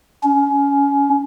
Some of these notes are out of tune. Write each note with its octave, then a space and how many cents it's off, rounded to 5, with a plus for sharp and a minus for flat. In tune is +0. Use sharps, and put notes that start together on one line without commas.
C#4 +25